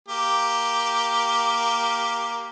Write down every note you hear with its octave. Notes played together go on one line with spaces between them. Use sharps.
A#3 G4